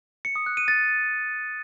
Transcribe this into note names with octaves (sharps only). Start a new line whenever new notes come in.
C#7
D#6
F#6
D#7
A6